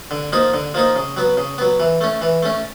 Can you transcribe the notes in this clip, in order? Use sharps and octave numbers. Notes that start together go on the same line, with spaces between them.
D3
F3 A#3 D#4
D3
F3 A#3 D#4
C#3
F#3 B3
C#3
F#3 B3
E3
A3 C#4
E3
A3 C#4